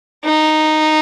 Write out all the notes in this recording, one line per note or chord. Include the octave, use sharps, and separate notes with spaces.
D#4